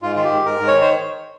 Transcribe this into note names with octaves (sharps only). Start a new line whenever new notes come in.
G#2 F4
D#3 F4
G4
G#2
G#2 A#4
G#2
C#5
D#3
C5